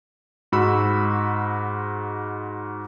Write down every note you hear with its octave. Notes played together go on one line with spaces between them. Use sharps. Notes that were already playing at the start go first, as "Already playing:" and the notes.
G#2 F#4 B5 E6